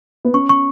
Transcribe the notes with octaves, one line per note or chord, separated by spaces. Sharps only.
B3
C#4 C#6
C#6